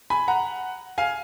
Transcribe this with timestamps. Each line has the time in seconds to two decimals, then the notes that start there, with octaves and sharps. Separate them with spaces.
0.10 G#5 B5
0.28 F#5 A#5
0.98 F5 G#5